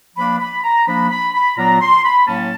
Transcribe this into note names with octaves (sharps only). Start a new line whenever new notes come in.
F3 A#3 D4 B5
B5
A#5
F3 A#3 D4 B5
B5
B5
A#2 F#3 B3 D4 A#5
C6
B5
A2 F#3 A#3 C#4 A5